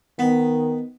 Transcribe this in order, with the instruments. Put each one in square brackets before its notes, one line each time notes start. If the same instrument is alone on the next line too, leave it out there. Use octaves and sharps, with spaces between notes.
[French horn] D#3 [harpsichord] B3